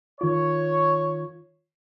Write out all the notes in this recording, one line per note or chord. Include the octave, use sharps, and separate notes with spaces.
D#3 F4 C#5